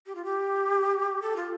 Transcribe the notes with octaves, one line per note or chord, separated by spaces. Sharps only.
G4
F4
G4
A4
F4